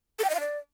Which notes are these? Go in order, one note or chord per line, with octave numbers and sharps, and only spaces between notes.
A4
G5
D#5
F5
D5